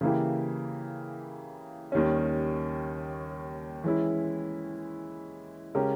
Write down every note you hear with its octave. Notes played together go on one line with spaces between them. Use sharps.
C#3 E3 A#3 E4 G4
D#2 D#3 G3 C#4
E3 G#3 C#4 E4
C#3 G#3 C#4 G4 A#4